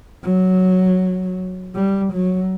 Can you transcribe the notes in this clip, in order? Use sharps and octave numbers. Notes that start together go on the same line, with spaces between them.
F#3
G3
F#3